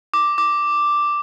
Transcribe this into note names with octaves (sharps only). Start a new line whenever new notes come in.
D6
D6